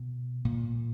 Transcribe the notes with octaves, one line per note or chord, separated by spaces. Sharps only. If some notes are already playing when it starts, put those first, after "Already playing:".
Already playing: B2
A#2